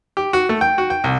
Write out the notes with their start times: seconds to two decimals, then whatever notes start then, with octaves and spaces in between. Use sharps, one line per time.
0.17 G4
0.33 F#4
0.49 A3
0.61 G5
0.78 F#4
0.90 G5
1.04 C2